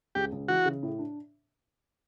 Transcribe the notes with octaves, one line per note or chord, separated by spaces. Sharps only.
C#2 G4
C#2
E3 F#4
C#3
A2
D4